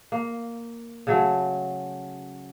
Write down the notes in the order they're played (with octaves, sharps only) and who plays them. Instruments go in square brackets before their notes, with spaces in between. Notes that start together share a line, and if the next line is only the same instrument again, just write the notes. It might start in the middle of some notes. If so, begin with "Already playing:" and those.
[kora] A#3
C#3 F#3 A3